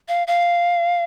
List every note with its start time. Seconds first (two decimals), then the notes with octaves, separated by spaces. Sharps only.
0.08 F5
0.27 F5